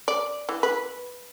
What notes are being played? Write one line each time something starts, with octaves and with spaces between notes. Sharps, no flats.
D5
E3
B4